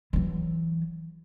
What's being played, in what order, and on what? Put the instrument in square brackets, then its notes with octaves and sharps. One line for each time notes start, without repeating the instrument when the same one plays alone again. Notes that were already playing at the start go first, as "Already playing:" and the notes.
[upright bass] E3 F#3